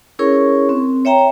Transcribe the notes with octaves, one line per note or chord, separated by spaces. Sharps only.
C#4 E4 G#4 A#4 C#5 C#6
C4
C#5 E5 G5 A#5